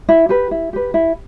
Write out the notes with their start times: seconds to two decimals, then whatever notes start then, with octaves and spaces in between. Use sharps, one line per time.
0.09 E4
0.29 G4 B4
0.51 E4
0.73 G4 B4
0.94 E4